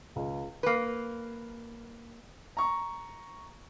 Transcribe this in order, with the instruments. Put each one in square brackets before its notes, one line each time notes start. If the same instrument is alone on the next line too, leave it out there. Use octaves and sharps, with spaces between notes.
[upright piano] C#2
[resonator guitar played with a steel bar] A#3 B4
[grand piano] A#5 C#6